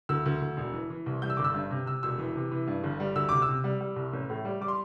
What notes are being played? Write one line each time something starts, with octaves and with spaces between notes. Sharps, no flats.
D2 E6
D2
D2
E1
E3
E3
C2
G3 G6
E6
G1 D6
E6
G2
C3
C3 E6
E1 E6
E3
C3
E3
G2
G1
G3
D2 E6
C3 D6
E6
C3
G3
G3
C2
A1
A2
G3
G3 D6
C6